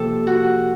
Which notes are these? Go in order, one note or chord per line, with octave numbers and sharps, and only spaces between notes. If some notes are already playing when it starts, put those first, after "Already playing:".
Already playing: C3 F3 A#3 G4 A4
F#4